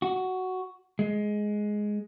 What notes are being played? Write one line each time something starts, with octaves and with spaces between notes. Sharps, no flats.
F#4
G#3